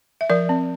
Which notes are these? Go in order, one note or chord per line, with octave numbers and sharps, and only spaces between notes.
E5
F3 A#4 D5
C4